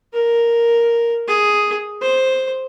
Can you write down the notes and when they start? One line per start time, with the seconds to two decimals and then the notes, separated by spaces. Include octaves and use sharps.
0.13 A#4
1.28 G#4
2.01 C5